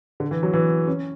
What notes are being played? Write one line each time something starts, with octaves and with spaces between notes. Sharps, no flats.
D3
E3
F#3
E3
C#4